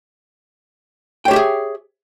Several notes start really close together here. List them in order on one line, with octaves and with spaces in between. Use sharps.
G5 C#5 G4 E5 G#4